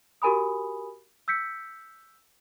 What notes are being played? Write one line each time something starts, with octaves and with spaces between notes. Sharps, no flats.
F#4 G4 A#4 G#5 B5 D#6
E6 G6 B6 C#7